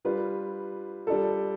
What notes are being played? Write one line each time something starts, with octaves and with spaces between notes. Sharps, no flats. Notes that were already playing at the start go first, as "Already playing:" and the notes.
G3 D4 F4 B4
G3 D4 F4 A4